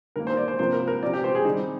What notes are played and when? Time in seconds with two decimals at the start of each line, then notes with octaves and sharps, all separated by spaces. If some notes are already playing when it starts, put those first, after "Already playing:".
0.16 D#3 A#3 A#4
0.27 C5
0.37 D5
0.48 C5
0.59 C3 F3 A#3 C5
0.73 A#4
0.88 A#4
1.02 C3 F3 C4 D5
1.13 G4
1.24 C5
1.35 G#4
1.45 D#3 G3 C4 D#4